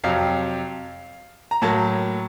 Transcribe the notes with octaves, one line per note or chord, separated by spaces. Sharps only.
F2 C3 F#3 F5
A#5
A2 F#3 A#3 A5